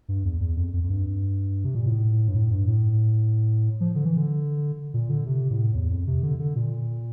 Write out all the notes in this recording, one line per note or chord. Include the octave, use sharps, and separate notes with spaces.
G2
E2
E2
F2
F2
F2
G2
C3
A#2
A2
G2
A2
G2
A2
F3
D3
E3
D3
A#2
D3
C3
A2
E2
F2
C3
D3
D3
A#2